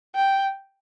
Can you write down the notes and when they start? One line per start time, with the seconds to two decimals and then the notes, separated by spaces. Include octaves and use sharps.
0.15 G5